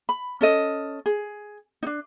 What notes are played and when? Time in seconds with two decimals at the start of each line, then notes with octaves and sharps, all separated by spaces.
0.09 B5
0.41 C#4 A4 D#5
1.06 G#4
1.83 D4 D#4